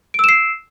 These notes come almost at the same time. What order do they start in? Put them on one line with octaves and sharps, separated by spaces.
D7 E6 E7 C7